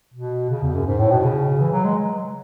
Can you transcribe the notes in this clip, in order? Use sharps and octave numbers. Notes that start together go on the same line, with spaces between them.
B2
C#3
E2
F#2
G#2
A2
B2
C#3
E3
F#3
G#3